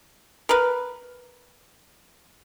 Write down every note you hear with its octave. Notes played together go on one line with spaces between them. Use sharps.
A#4 B4